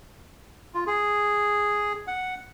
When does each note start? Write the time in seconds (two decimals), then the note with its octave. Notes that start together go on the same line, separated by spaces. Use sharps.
0.74 F4
0.87 G#4
2.07 F#5